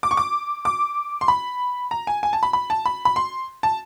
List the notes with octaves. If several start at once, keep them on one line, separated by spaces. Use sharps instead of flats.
D6
C#6
D6
D6
C6
B5
A#5
G#5
G#5
A5
B5
B5
A5
B5
B5
C6
A5